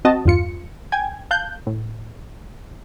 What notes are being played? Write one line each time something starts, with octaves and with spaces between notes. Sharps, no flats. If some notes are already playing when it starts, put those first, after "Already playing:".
C4 F#4 D#5 A5
E2 G2 F4 C#7
G5 G#5 G#6
F5 A5 F#6 G6
A2